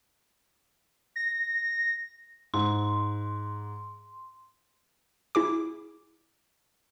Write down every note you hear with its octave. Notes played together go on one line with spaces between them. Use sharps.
A#6
G#2 C6
E4 G#4 D6